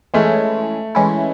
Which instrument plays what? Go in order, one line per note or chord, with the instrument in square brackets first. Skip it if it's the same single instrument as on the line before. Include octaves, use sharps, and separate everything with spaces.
[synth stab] E3 G#3 C#4 E4 [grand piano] A3
[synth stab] E3 G#3 C#4 E4